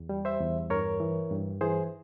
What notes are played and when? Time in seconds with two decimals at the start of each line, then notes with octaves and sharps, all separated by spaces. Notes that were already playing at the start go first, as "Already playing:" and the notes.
Already playing: E2
0.09 G3
0.25 C5 E5
0.40 E2
0.70 G2 A#4 C#5
1.00 E3
1.31 G2
1.61 E3 G#4 C5